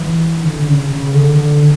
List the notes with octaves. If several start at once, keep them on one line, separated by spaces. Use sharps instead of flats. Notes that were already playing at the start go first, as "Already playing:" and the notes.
Already playing: E3
D3
D3
C#3
C#3
D3
D3